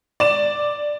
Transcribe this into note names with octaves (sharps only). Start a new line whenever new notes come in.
D5 E7